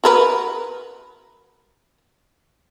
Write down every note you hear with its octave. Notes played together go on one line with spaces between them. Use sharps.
F#4 A#4 B4